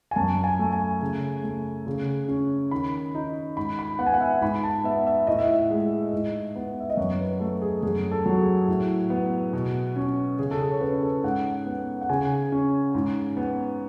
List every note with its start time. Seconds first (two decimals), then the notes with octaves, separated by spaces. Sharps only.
0.11 G#5
0.16 F#2 A5
0.44 G#5
0.59 A3
0.73 G#5
1.01 C#3
1.43 A3
1.87 C#3
2.28 C#4
2.71 D#3 B5
3.14 D#4
3.57 G#2 B5
3.79 B5
3.99 B3 F#5
4.07 G#5
4.14 F#5
4.20 E5
4.41 G#2 B5
4.63 A5
4.84 B3 E5
5.07 E5
5.27 A2 D#5
5.39 E5
5.50 D#5
5.70 G#3
6.13 G#2
6.56 B3
6.80 E5
6.90 D#5
6.97 F#2 C#5
7.20 B4
7.40 A3 A4
7.62 G#4
7.83 F#2 G#4
8.11 A4
8.26 F#3
8.40 G#4
8.68 A2
9.10 B3
9.53 B2
9.96 C#4
10.39 C#3 G#4
10.51 A4
10.60 G#4
10.71 C#5
10.81 C#4 B4
11.03 A4
11.23 G#2 F#5
11.66 B3
12.01 F#5
12.09 C#3 G#5
12.52 C#4
12.95 G#2
13.37 B3